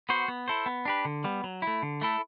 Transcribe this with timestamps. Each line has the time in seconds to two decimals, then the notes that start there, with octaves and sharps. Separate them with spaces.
0.09 B3 F#4 C5
0.28 B3
0.48 E4 A4 C5
0.66 B3
0.85 D4 G4 B4
1.05 D3
1.24 G3 B3
1.44 F#3
1.62 E4
1.67 A3
1.83 D3
2.01 A3 E4 A4